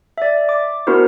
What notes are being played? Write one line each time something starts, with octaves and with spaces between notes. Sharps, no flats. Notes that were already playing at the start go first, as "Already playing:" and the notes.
D5 E5
D6
B3 D4 E4 F#4 A#4 C5